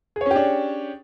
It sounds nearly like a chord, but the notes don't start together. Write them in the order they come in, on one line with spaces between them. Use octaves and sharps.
G#4 C#5 C#4 G4 D4